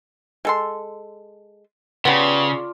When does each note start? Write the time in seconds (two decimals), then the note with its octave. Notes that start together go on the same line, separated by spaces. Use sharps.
0.45 G#3 A4 C6
2.05 C#3 B3 F4 G4 D5 A5